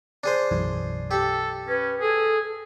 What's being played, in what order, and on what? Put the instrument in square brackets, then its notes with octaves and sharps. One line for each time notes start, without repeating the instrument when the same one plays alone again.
[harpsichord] D4 G#4 C5
[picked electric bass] B1 F#2 E3
[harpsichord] G4 [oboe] A4
[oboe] C#4 [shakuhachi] B4
[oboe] G#4 [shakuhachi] A4